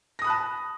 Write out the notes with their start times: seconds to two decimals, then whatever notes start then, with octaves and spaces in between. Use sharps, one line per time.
0.19 A#6
0.22 D#6
0.24 B5
0.27 F#6
0.30 A5